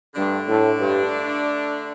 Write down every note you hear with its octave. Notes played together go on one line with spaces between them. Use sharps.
G2 D3 A3 D4
A2
G2